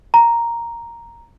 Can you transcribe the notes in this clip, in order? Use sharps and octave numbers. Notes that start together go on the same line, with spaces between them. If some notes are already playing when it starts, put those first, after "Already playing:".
A#5